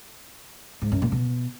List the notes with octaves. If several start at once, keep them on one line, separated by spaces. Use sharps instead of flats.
G#2
F#2
A#2
B2